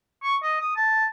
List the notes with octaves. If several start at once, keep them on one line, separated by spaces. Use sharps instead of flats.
C#6
D#5
D#6
A5